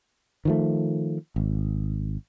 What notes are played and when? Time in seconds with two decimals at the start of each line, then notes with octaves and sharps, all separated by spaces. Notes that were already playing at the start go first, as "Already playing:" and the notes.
0.45 D#3 F3 A3
1.36 G#1